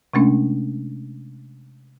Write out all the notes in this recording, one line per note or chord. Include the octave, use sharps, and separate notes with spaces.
C3 G#3 A3 C#4 D4